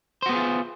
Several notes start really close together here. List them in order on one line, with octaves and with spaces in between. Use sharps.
C5 F#4 B3 G#4 F4